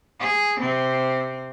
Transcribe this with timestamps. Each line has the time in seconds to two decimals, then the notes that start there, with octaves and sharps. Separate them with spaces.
0.20 G#4
0.59 C3 C4